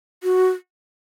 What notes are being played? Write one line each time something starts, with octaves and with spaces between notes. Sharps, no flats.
F#4